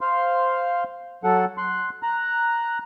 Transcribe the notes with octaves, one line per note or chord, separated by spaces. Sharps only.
C5 F5 C6
F#3 A4 F#5
C6 F#6
A#5 F#6